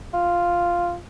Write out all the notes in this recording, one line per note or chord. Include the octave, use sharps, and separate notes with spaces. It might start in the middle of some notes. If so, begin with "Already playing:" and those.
F4